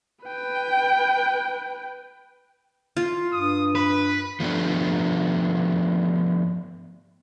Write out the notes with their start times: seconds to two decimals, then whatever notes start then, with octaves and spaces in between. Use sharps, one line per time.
0.24 B4 G5
2.97 F4
3.32 G2 D#6
3.75 B4 B5
4.40 F3 A3 B3 D4 G4